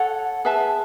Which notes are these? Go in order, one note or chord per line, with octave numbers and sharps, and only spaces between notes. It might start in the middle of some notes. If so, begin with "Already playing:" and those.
Already playing: A4 C#5 F#5
G#4 B4 E5 A5